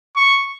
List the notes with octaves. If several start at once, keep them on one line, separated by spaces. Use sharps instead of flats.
C#6